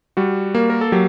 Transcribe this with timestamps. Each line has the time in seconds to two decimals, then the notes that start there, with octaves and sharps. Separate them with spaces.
0.17 G3 F#4
0.55 A#3
0.70 A#4
0.81 A4
0.92 F#3 G4